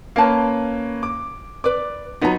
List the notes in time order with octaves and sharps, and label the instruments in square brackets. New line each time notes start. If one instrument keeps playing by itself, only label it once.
[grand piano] A#3 C#4 B4 [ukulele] F5 A5
[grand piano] D6
[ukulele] B4 D5 [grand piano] D6
[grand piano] F#3 B3 D#4 [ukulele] F4 A#5